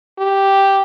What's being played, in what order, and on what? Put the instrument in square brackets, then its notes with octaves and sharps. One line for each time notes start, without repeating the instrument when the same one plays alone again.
[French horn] G4